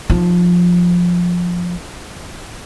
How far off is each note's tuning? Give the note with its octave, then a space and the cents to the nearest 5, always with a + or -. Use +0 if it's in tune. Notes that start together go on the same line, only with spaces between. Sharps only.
F3 +15 D#4 +0